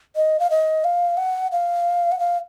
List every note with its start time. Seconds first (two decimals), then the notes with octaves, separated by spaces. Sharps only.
0.16 D#5
0.40 F5
0.51 D#5
0.84 F5
1.17 F#5
1.52 F5
2.12 F#5
2.19 F5